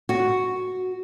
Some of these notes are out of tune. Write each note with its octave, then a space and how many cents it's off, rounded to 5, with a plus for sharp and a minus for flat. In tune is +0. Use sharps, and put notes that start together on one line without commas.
F#4 +0